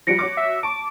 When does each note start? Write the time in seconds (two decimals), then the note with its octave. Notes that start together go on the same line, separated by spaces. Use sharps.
0.07 F3 G3 F#4 A#6 C#7 D7
0.19 F#4 C#5 D6
0.37 E5
0.63 A5 C#6 D6